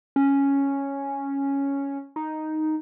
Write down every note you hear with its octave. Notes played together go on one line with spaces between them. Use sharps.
C#4
D#4